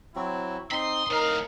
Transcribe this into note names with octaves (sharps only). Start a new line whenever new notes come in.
F#3 C4 E4 F#4
C4 D#4 B5 C6 D#6
A2 D#4 A#4 F5